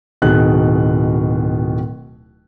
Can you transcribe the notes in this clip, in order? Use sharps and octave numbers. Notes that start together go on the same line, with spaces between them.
D1 B2 D#3 G#4 F#6